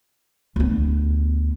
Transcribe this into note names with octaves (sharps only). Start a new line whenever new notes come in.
D2 B3